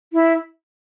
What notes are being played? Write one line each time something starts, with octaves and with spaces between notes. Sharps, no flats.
E4